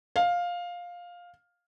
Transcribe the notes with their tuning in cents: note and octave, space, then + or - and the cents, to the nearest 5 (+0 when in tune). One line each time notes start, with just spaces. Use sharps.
F5 +10